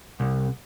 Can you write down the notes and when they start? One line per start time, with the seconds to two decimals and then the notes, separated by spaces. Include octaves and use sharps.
0.20 C2